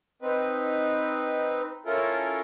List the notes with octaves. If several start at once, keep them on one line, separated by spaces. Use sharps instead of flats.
C4 D#4 B4
C#4 E4 F4 A4 A#4